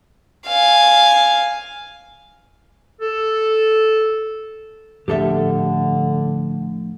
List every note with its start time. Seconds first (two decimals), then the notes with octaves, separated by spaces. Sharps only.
0.47 F5 G#5
3.01 A4
5.08 A2 D3 F3 D4 G4 A4 E5